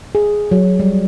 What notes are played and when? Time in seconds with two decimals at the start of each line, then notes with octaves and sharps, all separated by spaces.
0.15 G#4
0.51 F#3
0.79 G3